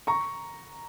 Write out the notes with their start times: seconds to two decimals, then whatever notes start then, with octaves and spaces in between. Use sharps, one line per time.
0.07 A#5 C#6